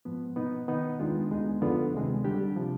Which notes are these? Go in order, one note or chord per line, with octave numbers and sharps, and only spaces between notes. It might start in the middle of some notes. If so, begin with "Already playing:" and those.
G#2 F3 B3
B2 B3 D#4
D#3 B3 D#4
D#2 D#3 G#3 D4 F4
D2 D3 G#3 B3 D#4
F2 D3 F3 B3 F4
D2 C3 D#3 G#3
D3 G3 D4 G4
C3 F3